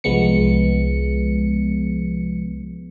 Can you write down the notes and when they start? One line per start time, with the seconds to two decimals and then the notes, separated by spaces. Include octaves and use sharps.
0.04 C2 F3 G#3 B3 C#7